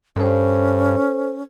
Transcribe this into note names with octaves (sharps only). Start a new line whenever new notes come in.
G2 C#4 A4 C5